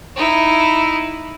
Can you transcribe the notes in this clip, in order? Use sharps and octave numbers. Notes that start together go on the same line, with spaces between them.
D#4 E4